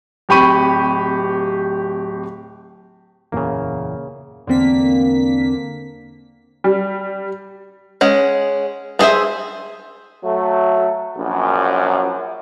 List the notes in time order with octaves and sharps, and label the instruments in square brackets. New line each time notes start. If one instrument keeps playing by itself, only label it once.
[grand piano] D1 C4 G4 B5 C#6 D#7
[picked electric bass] F#1 E2 A#2 [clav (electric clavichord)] C#3 A#3
[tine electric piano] E2 C4 [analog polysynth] D3 A#3 B6
[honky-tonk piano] G3
[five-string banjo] G#3 C#4 F#5
B3 D4 G#4 C5 E5
[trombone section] F#3 A3
A#1 F#2